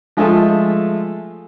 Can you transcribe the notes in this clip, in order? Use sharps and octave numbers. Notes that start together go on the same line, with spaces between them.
F3 G#3 A3 F4 A4 E5